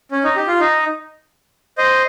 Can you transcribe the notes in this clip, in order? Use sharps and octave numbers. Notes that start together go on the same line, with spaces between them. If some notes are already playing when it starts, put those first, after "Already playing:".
C#4
D#4
G4
F4
D#4
C5 D#5